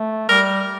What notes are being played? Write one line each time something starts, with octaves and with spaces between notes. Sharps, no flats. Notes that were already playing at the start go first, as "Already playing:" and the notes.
Already playing: A3
G3 A#4